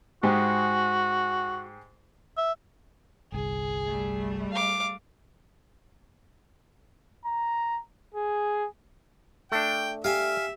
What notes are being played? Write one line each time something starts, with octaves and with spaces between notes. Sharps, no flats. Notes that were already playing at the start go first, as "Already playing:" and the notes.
G#2 G#3 F#4 G4
E5
G1 C2 G#4
G3 A3
F5 D6
A#5
G#4
A3 D4 G5
G4 E5 F5 G#5